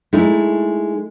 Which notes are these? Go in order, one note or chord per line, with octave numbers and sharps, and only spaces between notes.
G#3 A3 D#4 E4